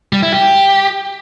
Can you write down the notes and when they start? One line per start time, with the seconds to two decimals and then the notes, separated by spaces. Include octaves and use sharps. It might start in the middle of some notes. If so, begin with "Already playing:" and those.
0.13 G3
0.23 E4
0.32 G4